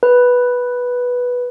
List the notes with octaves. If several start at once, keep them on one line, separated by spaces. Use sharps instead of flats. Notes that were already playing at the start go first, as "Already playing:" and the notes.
B4